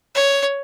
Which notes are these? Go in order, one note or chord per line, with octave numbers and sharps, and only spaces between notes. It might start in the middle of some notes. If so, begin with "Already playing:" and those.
C#5